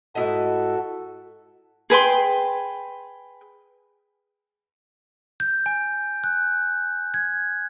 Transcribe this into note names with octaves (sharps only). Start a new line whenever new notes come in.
G#2 E4 F#4 A4 D#5
G#4 B4 G5 C6
G6
G#5
F#6
G#6